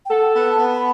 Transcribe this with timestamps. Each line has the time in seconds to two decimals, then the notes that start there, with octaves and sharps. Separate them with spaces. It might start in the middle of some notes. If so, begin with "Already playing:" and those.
0.05 G5
0.11 A4 F#5
0.35 B3
0.43 A5
0.58 B3
0.74 B5